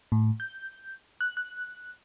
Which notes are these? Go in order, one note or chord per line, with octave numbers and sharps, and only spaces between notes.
A2
G6
F#6
F#6